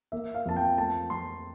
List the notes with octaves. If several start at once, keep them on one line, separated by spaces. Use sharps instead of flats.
A#3 E5
F5
F2 A5
G5
A3 A5
F2 C6